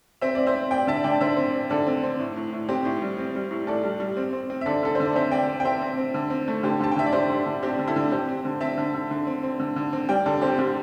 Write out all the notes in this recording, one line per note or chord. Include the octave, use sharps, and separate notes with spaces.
C4 C5 E5
C4 D5
C5 E5
C4
C4 D5 G5
D3 E5 A5
D3 D5 G5
D3 C5 E5
C4
C4
D3 A4 D5
C4
C4
A2
A2
A2
C4 G4 C5
A2
G3
C4
G3
A2
A2 A4 D5
G3
G3
C4
C4
C4
E5
D3 A4 D5
D3 A4
D3 C5
D5
C4 C5 E5
C4 D5 G5
C4
G5
C4 C5 E5
C4
C4
D3
C4
A3
D3 G4 C5
D3 A5
G5
D3 E5
D5
D3 G4 C5
D3
D3
C4 D4 G4
D3
E4 A4
D3
C4 G4 C5
C4
D3
C4 E5 A5
D3
D3
D3
C4
C4
D3
D3
C4
G3 D5 G5
D3 A4 D5
C4 G4 C5
D3 D4 G4